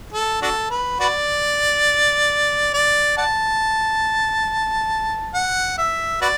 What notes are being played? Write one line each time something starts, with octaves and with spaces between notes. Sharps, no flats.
A4
D4 F#4 A4
B4
F#4 B4 D5
D5
D5 F#5 A5
F#5
E5
F#4 B4 D5